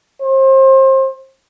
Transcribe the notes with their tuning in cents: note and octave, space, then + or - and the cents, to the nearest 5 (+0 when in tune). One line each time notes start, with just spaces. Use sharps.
C5 +30